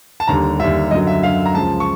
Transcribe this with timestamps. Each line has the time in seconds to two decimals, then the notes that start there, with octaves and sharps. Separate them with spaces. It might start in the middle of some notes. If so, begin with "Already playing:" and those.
0.20 A5
0.28 D#2 D3 G3 A#5
0.60 D#2 D3 G3 E5
0.91 F#2 D3 F#3 D#5
1.07 E5
1.23 F#2 D3 F#3 F5
1.46 A#5
1.54 C#2 C#3 F3 A5
1.80 C#6